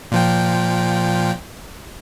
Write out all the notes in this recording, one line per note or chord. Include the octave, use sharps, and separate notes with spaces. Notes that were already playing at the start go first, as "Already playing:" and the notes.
A#2 F3 G5